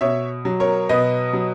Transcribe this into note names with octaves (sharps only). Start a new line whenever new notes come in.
B2 C#5 E5
F#3
A#4 C#5
B2 B4 D#5
F#3